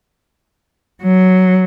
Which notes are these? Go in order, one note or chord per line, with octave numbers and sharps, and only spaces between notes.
F#3